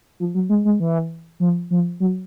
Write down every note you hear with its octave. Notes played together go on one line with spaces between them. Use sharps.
F3
F#3
G#3
G#3
E3
F3
F3
F#3